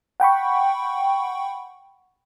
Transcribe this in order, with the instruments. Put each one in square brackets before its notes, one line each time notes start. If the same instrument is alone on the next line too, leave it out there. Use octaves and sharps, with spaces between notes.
[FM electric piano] F#5 G5 B5 C#6